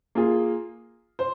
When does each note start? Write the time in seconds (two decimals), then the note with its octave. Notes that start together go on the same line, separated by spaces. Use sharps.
0.15 A#3 F4 G#4
1.19 C5